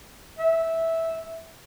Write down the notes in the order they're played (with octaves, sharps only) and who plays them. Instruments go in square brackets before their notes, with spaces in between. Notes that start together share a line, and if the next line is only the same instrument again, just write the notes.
[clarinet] E5